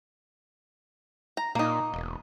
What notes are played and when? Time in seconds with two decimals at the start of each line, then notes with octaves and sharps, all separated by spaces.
1.37 A#5
1.55 A#2 A#3 D#4
1.94 E1